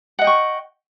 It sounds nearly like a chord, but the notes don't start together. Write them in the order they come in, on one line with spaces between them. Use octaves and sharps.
F#5 D#5 G5 C#6